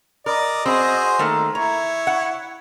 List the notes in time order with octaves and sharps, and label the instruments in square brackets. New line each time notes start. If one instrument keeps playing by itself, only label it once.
[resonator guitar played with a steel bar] A#4 [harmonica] D5 [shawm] D#5
[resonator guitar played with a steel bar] C4 [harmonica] F#4 G#4 C5
[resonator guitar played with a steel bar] D#3 A3 A#3
[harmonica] E4 [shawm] C#5 [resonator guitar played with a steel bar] A#5
[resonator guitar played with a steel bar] F#5